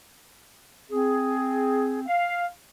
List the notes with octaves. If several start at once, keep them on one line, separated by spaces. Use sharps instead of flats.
C4 G#4
F5